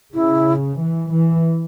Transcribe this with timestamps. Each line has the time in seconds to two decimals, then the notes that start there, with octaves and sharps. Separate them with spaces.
0.14 C#3 E4
0.78 E3
1.09 E3